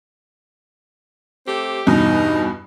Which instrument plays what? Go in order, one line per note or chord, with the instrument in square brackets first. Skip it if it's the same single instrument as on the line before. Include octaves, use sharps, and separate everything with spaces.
[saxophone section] A3 C4 G4
[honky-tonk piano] E2 G2 B2 [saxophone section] D#4